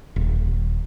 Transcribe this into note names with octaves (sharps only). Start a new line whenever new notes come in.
D#1